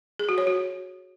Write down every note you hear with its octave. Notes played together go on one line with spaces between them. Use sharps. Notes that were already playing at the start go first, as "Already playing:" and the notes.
G#4
F#4
C#5
F#4